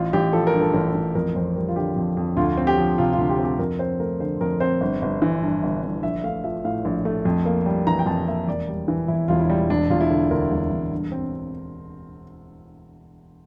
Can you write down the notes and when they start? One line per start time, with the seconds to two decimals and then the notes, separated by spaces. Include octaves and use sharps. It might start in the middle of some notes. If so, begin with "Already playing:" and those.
Already playing: A1 F4
0.13 A1 G4
0.33 F3 A4
0.47 A#4
0.54 G2
0.61 A4
0.74 A1 A#4
0.88 A4
0.94 A1
1.15 F2 A#4
1.35 F2 C5
1.56 G3 A#4
1.69 F4
1.76 D3 G4
1.96 F2
2.17 F2
2.37 D2 F4
2.57 C4
2.67 G4
2.78 F3
2.98 C3 F4
3.13 D2 F4
3.29 G4
3.39 C4
3.44 G4
3.59 F2 A#4
3.79 C4 C5
4.00 A3 A#4
4.20 D3 C5
4.41 F2 A#4
4.60 C4 C5
4.81 G1
5.02 G1
5.22 E3
5.43 G2
5.63 G1
5.83 G1
6.03 A#1 E5
6.24 A3 F5
6.44 F3 E5
6.65 A2 F5
6.85 A#1
7.05 A3
7.25 F2
7.45 A#3
7.66 G3
7.87 E3 A#5
7.99 G5
8.06 F2 A5
8.27 A#3 E5
8.47 E1 D5
8.69 G3
8.88 E3
9.08 E2 E4
9.28 E1 F4
9.40 E4
9.49 G3
9.70 E1 D4
9.90 E1 F4
10.01 E4
10.10 D3
10.31 D2 A#4
10.51 E1
10.72 E1
10.92 G2
11.12 C4